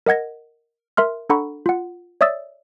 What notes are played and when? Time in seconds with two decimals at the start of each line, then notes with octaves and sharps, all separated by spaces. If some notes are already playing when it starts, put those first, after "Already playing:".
0.07 A#4 D#5 F#5 G#6 A#6
0.97 A#4 E5 C6 F6
1.30 D4 A4 F#5 A#5 B5 C#6
1.66 F4 F#5
2.21 C#5 D5 E5 D#6 E6 A6